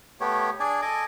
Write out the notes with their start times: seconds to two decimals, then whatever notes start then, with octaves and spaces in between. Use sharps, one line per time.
0.20 A3 B3 G4 C#5
0.60 D4 G#4 D5 G#5
0.82 A4 D#5 G#5 D6